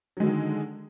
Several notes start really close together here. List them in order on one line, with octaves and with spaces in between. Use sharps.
F#3 G#3 D3 D#3